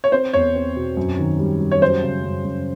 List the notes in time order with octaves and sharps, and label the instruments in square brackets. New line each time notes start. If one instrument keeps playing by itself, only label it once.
[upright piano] C#5
[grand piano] C4 [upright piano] C5
[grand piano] E2 [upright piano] C#5
[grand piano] C4
B2
F#2
D#3
G3
G3
[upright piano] C#5
[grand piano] F#2 [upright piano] C5
[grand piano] C#3
F#2
F#2